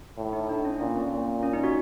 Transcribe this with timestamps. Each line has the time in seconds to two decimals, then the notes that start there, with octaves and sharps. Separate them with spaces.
0.17 A2
0.33 D#4
0.49 D4
0.65 C#4
0.80 A#2 C#4
0.96 C4
1.11 A#2
1.43 C#4
1.53 D#4
1.64 F#4